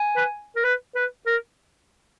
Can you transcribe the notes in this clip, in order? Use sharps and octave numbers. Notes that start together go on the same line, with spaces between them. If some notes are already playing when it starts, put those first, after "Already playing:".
Already playing: G#5
B4
A#4
B4
B4
A#4